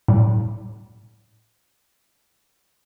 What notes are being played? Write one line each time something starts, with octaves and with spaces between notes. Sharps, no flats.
A2 G3